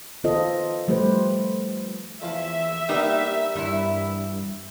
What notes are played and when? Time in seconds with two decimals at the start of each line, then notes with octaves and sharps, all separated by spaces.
0.24 D#3 B3 F4 A4 C5 D#5
0.88 F3 G3 A3 G4 B4 C5
2.22 E2 F3 E5 F5
2.89 G3 A#3 B3 D#4 G4 A#4
3.55 E2 G2 E4